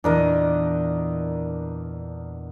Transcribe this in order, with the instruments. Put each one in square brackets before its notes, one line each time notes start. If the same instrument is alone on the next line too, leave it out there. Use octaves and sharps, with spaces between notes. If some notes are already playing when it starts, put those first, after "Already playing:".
[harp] E2 A#2 E3 [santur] D4 A#4 D#5